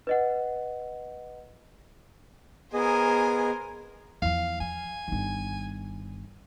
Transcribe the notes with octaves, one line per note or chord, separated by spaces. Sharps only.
B4 D#5 F#5
B3 G#4 A#4 C5 D#5 G#5
E2 F3 F5
F3 G#5
G1 D#3